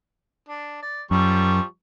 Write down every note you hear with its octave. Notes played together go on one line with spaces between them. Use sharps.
D4
D5
F#2 F3 G3 C#6